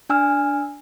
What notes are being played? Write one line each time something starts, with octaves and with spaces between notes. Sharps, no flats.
D4 G#5 E6 F6